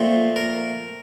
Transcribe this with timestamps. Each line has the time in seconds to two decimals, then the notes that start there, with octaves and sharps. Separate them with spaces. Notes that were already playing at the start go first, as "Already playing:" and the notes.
Already playing: A#2 F3 A3 C4
0.36 A#4